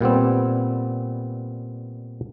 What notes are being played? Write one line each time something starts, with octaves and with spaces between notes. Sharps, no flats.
A#2 G3 B3 C4